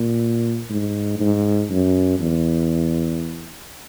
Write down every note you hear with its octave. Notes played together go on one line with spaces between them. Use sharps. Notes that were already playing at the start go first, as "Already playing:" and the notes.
Already playing: A#2
G#2
G#2
F#2
E2